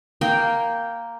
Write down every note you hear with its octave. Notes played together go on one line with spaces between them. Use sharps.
A#3 G5